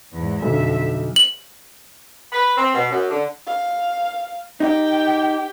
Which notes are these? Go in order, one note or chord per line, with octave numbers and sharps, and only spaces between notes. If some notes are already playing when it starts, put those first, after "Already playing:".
E2 G#2
B1 F2 D3 E5
F#7
B4
C4
B2
F#2
D3
F5
D#4 G4 G5